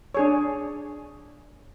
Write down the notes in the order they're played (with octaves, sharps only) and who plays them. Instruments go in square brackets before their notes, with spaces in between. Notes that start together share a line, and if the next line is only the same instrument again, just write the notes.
[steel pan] D4 G#4 C#5